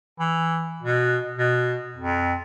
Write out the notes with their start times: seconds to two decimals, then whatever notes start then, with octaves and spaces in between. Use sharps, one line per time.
0.20 E3
0.82 B2
1.38 B2
1.97 F2